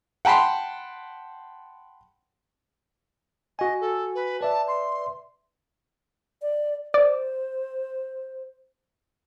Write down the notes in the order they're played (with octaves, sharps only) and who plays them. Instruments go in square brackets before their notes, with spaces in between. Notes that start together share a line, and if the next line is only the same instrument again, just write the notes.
[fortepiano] F#5 G5 A5 B5 C6
[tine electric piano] F#4 G#5 [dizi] D#5
[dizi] A4
B4
[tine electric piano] B4 D5 E5 [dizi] A5
[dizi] C6
[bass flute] D5
[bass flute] C5 [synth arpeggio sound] D5